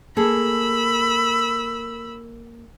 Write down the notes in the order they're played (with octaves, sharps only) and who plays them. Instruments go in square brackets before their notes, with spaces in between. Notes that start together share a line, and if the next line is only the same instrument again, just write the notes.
[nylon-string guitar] A#3 G#4 A4 [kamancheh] B5 E6